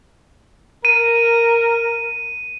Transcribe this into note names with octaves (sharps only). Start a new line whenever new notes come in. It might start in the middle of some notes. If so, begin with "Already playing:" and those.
A#4 D#7